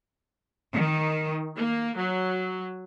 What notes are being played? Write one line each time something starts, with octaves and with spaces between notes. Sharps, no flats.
D#3
A#3
F#3